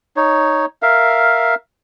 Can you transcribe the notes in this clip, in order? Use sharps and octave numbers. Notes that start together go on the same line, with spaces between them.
D#4 C#5
A#4 E5 F5